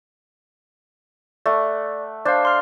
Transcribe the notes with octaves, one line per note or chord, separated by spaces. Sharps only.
A3 D5 F#5
D4 C5 D5 F5
C6 F6